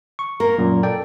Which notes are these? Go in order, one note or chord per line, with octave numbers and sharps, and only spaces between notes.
C#6
A#3 A#4
F#2 A#2
A4 D5 G5